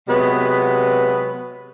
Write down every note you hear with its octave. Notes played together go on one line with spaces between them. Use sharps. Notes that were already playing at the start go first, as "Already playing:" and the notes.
C3 F#3 G#3 B3